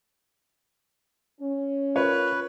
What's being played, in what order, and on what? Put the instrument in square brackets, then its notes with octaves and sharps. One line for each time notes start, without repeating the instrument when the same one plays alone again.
[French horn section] C#4
[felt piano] F4 A#4 C#5 [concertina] B4